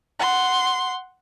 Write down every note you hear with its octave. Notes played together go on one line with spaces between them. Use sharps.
F#5 C6